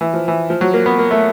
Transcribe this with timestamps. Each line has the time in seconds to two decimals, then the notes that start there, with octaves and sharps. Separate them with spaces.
0.01 E3
0.14 F3
0.28 E3
0.50 F3
0.61 F#3
0.74 A#3
0.86 B3
0.98 A#3
1.11 A3